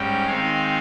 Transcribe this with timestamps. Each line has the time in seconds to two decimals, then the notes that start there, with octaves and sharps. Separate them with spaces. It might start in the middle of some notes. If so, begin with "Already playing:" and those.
Already playing: G#2 G3 C#4 G5
0.25 D#3 G#3 C4 D#4 F5